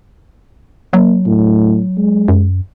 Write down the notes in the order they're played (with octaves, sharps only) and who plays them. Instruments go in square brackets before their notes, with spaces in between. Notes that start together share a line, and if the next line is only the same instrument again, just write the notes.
[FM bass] F#3 [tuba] A#3
[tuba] A2
G#3
[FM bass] F#2